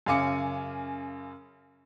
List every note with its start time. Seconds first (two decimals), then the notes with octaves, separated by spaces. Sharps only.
0.06 F#2 C#3 F5 G#5 D6 C#7